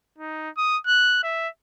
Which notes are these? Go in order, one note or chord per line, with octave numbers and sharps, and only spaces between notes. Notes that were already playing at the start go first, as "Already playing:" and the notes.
D#4
D#6
F#6
E5